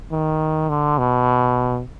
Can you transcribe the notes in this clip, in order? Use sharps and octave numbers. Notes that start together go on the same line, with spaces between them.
D#3
D3
B2